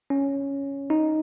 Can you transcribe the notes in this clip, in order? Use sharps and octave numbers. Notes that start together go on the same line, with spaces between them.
C#4
D#4